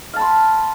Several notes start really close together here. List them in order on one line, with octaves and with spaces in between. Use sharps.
F5 A5 B5 C6